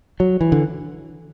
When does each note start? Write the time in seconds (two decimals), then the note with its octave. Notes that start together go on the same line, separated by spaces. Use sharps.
0.20 F#3
0.41 E3
0.52 D3